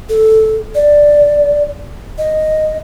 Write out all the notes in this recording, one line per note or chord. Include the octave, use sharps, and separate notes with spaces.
A4
D5
D#5